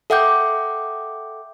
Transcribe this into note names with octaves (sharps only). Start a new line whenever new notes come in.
A4 E5 F#5 G5 D6 G6